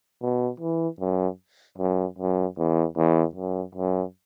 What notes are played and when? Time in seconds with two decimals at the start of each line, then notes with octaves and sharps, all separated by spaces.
0.22 B2
0.60 E3
1.00 F#2
1.78 F#2
2.18 F#2
2.58 E2
2.97 E2
3.35 F#2
3.75 F#2